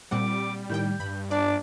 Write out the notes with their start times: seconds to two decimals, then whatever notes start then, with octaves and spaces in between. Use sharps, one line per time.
0.11 A#2 G3 C4 F#5 D6
0.70 A2 D#3 G5 G6
1.00 G2 B5
1.31 D4 D5 D6